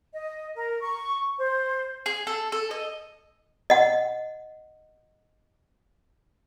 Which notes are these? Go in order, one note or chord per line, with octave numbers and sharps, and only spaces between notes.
D#5
A#4
C#6
C5
G#4
A4
A4
D#5
D#5 F#5